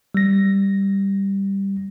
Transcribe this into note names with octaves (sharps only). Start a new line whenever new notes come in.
G3 A#6